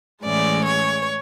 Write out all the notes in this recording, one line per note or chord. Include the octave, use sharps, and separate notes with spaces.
A2 E3 G#3 C#4 D5
C#5